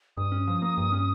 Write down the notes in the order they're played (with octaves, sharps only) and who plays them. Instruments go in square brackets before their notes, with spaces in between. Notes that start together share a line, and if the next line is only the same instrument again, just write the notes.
[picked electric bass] G2 [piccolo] D#6
[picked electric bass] C#4
F3
A#3
G2
C#4